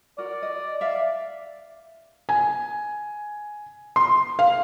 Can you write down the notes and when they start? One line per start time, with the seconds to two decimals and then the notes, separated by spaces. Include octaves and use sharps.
0.18 F#4 A#4 D5
0.43 D#5
0.81 E5 F5
2.29 G#5
3.96 C6
4.39 F5